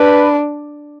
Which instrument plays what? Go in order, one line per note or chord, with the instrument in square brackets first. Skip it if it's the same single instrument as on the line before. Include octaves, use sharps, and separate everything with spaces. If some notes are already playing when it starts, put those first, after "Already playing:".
Already playing: [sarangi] D4 [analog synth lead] B4